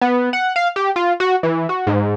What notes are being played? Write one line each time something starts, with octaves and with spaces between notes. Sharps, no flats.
B3
F#5
F5
G4
F4
F#4
E3
F#4
G#2